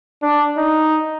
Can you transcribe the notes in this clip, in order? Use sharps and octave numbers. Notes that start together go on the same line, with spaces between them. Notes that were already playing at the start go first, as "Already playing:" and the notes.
D4
D#4